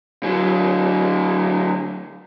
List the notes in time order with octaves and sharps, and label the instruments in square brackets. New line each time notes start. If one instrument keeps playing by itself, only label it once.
[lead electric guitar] D3 F#3